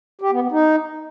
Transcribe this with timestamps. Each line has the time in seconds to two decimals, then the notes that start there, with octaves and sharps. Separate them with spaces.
0.21 G4
0.31 B3
0.42 B3
0.52 D#4